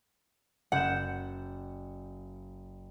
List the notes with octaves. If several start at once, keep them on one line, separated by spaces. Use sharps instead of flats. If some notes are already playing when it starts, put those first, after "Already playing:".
F#1 F#5 G6 E7